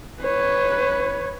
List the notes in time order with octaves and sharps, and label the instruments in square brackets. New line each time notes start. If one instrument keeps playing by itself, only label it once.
[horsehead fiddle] B4 C#5